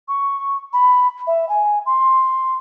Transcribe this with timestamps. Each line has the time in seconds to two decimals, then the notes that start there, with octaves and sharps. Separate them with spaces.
0.08 C#6
0.73 B5
1.27 E5
1.49 G#5
1.86 C6